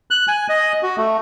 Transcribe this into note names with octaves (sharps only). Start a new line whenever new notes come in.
F#6
G#5
D#5
F#4
A3